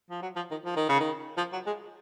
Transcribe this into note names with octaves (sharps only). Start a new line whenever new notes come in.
F3
F#3
F3
D#3
F3
D#3
C#3
D#3
F3
F#3
G#3